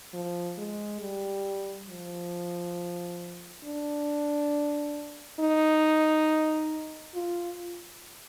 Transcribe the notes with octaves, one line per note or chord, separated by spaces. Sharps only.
F3
G#3
G3
F3
D4
D#4
F4